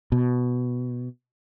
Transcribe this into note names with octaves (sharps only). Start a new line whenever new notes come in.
B2